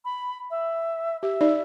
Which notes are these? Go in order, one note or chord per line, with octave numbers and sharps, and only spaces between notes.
B5
E5
G4 E5
D#4 D5